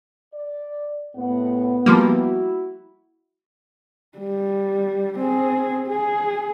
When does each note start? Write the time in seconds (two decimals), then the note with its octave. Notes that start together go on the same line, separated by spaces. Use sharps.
0.34 D5
1.16 C2 A2 B3 F#5
1.86 F3 G3 A#3 E4 F#4
4.19 G3
5.19 C4 G#4
5.87 G#4